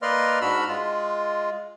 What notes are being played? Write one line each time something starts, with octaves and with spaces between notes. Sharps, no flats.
A#3 B4 D5 D#5 C6 F6
G#2 D4 F#4 B5 E6 F6
G#3 F4